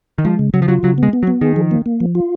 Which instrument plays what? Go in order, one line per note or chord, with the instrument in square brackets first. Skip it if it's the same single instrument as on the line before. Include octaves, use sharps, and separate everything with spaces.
[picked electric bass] D#3
[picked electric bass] F3 [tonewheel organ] G#3
[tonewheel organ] C#3
[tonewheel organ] C#3 [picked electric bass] F#3
[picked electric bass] F3
[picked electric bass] F#3 [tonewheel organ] F4
[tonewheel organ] C#3 [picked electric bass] F#3
[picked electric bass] G#3 [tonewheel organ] B3
[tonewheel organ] B3
[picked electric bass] F#3
[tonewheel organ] B3
[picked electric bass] D#3 [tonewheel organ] G#4
[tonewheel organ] F3
A#3
A#3
F3
F4